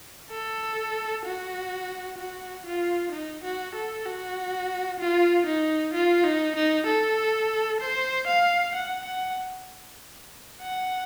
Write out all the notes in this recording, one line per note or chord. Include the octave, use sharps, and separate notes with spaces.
A4
F#4
F#4
F4
D#4
F#4
A4
F#4
F4
D#4
F4
D#4
D#4
A4
C5
F5
F#5
F#5
F#5